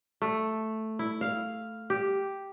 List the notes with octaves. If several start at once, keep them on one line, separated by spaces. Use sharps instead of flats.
A3
E4
F5
G4